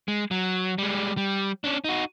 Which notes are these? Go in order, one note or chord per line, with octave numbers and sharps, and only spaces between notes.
G#3
F#3
G3 G#3
G3
C#4 D4
D#4 F#4